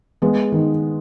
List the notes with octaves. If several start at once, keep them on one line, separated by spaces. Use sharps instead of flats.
G#3 B3
D#3